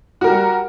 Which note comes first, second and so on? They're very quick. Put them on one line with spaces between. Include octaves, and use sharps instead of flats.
F#4 A#4 G4 G3